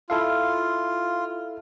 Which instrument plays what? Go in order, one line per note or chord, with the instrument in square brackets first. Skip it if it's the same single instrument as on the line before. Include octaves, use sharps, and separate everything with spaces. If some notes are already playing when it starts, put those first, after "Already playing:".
[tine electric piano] E4 A4 F5 [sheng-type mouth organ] F4